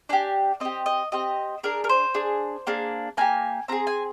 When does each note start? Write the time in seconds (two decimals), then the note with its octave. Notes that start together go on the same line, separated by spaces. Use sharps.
0.09 D4 G4 G#5
0.60 C4 G4 D#5
0.86 D#5
1.12 C4 G4 D#5
1.63 D4 G#4 A#4
1.84 A#4
1.89 C5
2.15 D4 G#4
2.67 A#3 D4 G#4
3.17 A#3 D4 G4 G#5
3.68 C4 F4 G#4 A#5
3.87 G#5